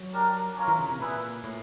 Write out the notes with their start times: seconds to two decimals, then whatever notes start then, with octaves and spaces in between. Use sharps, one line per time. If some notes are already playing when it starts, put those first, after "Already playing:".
Already playing: F#3
0.13 D4 G4 A#4
0.57 C#4 F4 A#4
0.68 E3
0.78 C#3
0.89 C3
1.00 A#2 E4 G#4 B4
1.44 A2